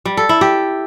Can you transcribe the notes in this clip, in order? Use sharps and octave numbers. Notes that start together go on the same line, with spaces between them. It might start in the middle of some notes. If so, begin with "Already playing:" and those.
G3
A4
E4
G4